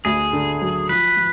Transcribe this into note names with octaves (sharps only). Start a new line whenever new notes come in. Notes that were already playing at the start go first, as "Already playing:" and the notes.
D2 G#4
D3
F#3
F3 B4
F3